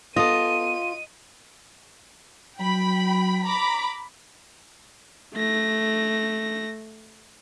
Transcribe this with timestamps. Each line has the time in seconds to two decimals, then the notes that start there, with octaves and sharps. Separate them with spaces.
0.16 B3 F4 A4 D#5 D#7
2.60 F#3 G5 B5
3.45 A#5 B5 D6
5.34 A3 A#6